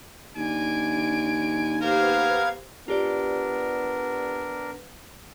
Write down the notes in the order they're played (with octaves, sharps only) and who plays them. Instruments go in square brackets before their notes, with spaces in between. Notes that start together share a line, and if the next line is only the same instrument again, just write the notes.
[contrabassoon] D#2 [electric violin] D4 D7 [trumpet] G#5
[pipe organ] B3 F5 G#6 [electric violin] G4 C5 [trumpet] A#4
[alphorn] B3 [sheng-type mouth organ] D4 A#4 [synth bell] F4 G4 D5